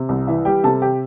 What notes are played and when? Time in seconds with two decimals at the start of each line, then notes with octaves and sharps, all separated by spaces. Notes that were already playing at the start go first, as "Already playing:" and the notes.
Already playing: C3
0.09 C2
0.27 E3 E4 E5
0.45 G3 G4 G5
0.63 C3 A4 A5
0.82 G4 G5